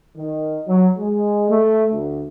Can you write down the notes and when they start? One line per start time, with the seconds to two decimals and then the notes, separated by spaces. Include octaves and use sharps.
0.17 D#3
0.67 F#3
0.98 G#3
1.50 A3
1.93 D2